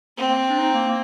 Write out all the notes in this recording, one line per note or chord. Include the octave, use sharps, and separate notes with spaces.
A#3 C4
A#3
D4
D#4
A#3
A#3